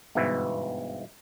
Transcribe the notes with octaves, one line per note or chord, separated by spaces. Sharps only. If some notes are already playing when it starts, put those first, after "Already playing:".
G1 G#2 B2 E3 E4